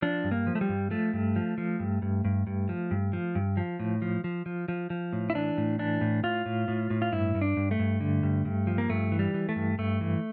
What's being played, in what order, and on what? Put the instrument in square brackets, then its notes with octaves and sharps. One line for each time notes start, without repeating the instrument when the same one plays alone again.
[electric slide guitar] F3 D4
G2
A#3
F3
A3
G3
G2
F3 A3
G2
F3
F3
G2
G2
G2
G2
F3
G2
F3
G2
F3
A2
F3
F3
F3
F3
F3
A2
E4
E3 D4
A2
E3 D4
A2
A2 F4
A2
A2
A2
F4
G2 E4
G2
D4
G2
A3
G2
D3
G2
G2
F3
A#3
G2 A3
E3
G3
E3
A3
G2
G2 A3
E3